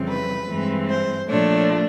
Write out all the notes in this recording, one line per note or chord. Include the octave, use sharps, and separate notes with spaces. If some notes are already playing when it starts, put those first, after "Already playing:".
Already playing: F2 C#3 E3 G3 C4
B4
G2 E3 G#3 C4
C5
A#2 F3 A3 D4 C#5